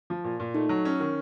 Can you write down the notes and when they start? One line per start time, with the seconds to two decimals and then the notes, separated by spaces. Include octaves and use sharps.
0.10 F3
0.24 A#2
0.40 A#2
0.54 A3 D#4
0.69 F#3
0.85 C#4
1.00 D#3